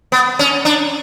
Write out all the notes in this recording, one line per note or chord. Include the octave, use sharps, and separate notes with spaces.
B3
C#4
D4